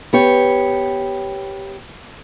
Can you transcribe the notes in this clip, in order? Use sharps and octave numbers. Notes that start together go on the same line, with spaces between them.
B3 G4 C#5